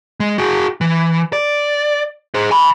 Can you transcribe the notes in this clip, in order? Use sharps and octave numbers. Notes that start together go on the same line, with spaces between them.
G#3
F#4 G#4
E3
D5
G#4 C5
G#5 B5